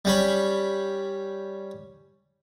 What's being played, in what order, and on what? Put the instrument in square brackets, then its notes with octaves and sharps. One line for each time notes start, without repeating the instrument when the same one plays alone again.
[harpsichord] G3 C#4 B5